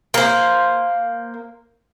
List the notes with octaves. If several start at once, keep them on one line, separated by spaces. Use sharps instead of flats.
A#3 C5